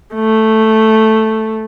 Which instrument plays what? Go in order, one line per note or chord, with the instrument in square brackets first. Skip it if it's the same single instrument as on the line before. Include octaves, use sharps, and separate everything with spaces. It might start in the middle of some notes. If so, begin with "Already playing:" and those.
[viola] A3